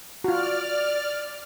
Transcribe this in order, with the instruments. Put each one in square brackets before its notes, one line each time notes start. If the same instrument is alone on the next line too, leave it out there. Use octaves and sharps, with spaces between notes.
[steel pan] F4 F#4 [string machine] D5 F6